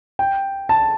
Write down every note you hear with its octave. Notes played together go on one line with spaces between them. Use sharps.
G5
A5